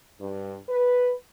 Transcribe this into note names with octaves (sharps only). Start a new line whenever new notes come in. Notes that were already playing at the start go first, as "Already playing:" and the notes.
G2
B4